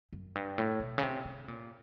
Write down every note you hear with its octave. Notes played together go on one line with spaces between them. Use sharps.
F#2
G2
A2
B2
C#3
C3
C3
A#2